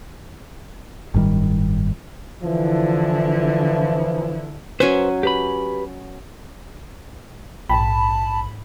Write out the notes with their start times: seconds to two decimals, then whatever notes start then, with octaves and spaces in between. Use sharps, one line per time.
1.14 F#1 G#2 D#3 G3
2.42 D3 E3 F3 E4
4.80 F#3 C#4 B4 C5 G#5
5.23 G4 B4 B5
7.69 A#1 G#2 G5 A5 B5